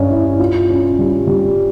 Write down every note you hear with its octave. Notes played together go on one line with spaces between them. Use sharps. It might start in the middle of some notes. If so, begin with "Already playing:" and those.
Already playing: G2 C#4
E4
F4
C#4
G3
G3